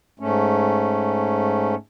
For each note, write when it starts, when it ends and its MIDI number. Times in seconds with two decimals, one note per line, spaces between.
0.20 1.75 44
0.20 1.75 57
0.20 1.75 61